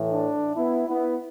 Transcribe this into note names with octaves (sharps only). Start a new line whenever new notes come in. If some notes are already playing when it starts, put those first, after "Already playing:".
Already playing: A2 E3 A3
D4
B3 E4
B3 E4